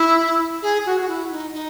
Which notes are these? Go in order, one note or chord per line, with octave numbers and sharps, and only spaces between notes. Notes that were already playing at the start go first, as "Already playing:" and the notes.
Already playing: E4
G#4
F#4
F#4
E4
D#4
D#4